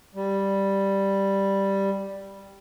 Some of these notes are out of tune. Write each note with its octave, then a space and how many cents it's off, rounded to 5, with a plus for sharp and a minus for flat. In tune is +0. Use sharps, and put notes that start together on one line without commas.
G3 +0